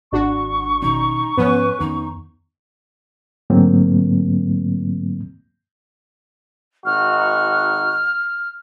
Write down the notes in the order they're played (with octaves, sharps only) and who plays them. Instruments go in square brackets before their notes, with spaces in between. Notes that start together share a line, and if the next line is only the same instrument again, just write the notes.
[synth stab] G#1 D4 F#4 [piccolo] C#6
[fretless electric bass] B2 D#3 C#4 [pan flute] D#4
[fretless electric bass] G#2 F3 [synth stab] B3 C#4 [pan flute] B4
[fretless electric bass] F2 D#3 [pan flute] D#4
[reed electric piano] G#2 D3 F#3 A3 A#3 C4
[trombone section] G#1 D#4 F#4 [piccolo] F6